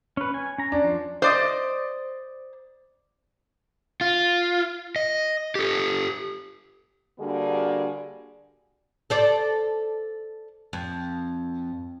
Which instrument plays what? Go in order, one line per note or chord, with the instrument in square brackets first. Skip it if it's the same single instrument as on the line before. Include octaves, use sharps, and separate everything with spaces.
[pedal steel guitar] C#4 B4
G#5
C#4 A#5
[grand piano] D4
[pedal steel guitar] F3
[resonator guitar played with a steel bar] C5 D5 D#5
[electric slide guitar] F4
D#5
G4 A4
[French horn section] D3 G3 A#3 D4 F#4 G#4
[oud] A4 C5 D5
F2